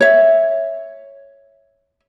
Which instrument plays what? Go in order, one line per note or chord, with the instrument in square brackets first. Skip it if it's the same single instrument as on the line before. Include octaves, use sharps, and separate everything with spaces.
[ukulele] C#5 E5